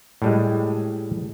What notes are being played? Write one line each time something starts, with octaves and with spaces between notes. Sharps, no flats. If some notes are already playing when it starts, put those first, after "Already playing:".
A2 G3 G#3